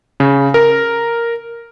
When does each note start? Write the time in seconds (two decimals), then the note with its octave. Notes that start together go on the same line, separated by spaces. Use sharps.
0.20 C#3
0.54 A#4